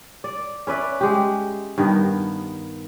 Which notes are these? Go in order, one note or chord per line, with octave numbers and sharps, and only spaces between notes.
D5
C#4 B4 D5 E5
G#3 G4
G2 D#3 B3 D#4